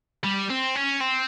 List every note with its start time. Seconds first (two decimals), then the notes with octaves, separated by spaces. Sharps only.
0.24 G3
0.50 C4
0.75 C#4
1.01 C4